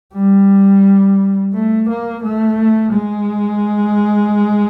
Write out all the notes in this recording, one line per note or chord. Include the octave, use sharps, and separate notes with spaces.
G3
A3
A#3
A3
G#3